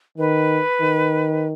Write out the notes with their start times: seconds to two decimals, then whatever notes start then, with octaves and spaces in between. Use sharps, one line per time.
0.18 D#3 B4
0.81 D#3